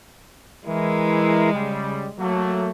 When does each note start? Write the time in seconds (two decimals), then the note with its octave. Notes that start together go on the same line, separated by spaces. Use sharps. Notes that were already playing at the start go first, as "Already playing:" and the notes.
0.66 E3 G#3 E4 A#4
1.52 C#3 G3
2.18 F#3 A3 A#3